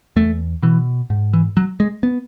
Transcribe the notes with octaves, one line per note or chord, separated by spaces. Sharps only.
E2 A3
B2 E3
G#2
E3
F#3
G#3
B3